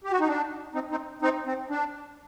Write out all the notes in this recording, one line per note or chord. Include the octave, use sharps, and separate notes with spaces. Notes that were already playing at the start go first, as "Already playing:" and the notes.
G4
F#4
D#4
D4
C4 D#4
C4 D#4
C4 D#4
C4
D4